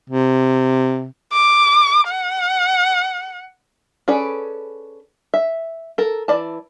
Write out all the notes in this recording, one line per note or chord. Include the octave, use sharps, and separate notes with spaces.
C3
D6
F#5
C#4 G#4 A4 B4 D5
E5
A4 A#4
E3 D5 A5